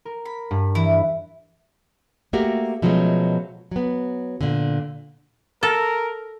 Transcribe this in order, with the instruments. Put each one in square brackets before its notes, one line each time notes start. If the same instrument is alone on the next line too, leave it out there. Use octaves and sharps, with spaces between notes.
[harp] A#4
[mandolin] B5
[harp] G2
[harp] E3 [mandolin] E4
[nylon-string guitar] A3 A#3 F#4 G4 A#4
B2 F3 F#3 G#3 A3 C#4
F#3 B3
A#2 D3
[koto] A4 [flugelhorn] A#4